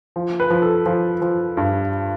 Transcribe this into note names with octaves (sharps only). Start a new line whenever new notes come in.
F3
B4
F3
A4
F3
F3
G2